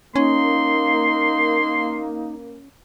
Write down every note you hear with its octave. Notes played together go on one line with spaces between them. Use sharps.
A#3 C#4 D#4 C6